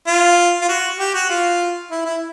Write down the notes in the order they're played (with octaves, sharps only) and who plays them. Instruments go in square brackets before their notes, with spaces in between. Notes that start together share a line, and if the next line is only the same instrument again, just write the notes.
[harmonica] F4
F4
F#4
G4
F#4
F4
E4
E4